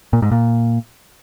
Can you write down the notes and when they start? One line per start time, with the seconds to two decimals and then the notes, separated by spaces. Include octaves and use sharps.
0.13 A#2
0.22 G#2
0.32 A#2